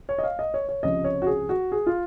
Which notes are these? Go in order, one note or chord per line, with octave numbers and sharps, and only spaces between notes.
C#5
D#5
F5
D#5
C#5
C#5
C#2 C3 F3 D#5
C#5
F#4
G#4
F#4
G#4
F4